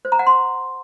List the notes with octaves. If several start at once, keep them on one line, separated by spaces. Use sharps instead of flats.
C5
A#5
F#5
C6